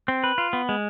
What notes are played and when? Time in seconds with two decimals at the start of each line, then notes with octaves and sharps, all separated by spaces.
0.08 C4
0.24 B4
0.38 F4
0.53 B3
0.69 G#3